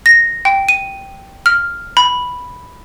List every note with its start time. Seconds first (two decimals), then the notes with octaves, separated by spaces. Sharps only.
0.06 A#6
0.45 G5
0.69 D#7
1.46 F6
1.97 B5